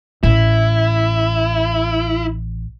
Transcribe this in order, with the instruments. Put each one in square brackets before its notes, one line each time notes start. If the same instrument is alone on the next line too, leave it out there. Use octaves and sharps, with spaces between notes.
[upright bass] A1 [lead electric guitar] E4